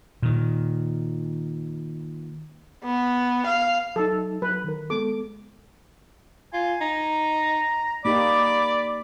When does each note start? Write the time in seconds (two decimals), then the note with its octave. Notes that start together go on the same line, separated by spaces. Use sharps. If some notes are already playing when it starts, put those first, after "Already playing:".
0.22 A#2 D#3
2.84 B3
3.46 F5
3.96 F#3 D#4 A4
4.42 F#3 B4
4.64 D#3 A#4
4.90 G#3 B3 A4 D6
6.53 F4 G#5
6.81 D#4 A#5
8.05 A#3 D#4 G4 D5 B5 D6